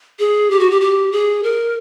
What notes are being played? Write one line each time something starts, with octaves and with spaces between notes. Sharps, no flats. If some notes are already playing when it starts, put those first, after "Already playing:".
G#4
G4
F#4
G4
G4
G#4
A#4